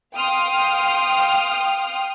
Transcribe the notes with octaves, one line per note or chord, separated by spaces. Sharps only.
F5 G5 C6 D#6 F6